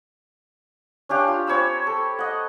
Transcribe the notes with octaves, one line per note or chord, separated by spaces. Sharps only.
C#4 D4 G4 F5
F4
C4 C#5 B5 E6
A4
D#5 F#5